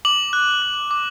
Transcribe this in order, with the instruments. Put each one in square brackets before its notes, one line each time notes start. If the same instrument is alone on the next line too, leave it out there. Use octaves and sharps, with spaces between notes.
[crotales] D6 F#7
F#6
F#6
D6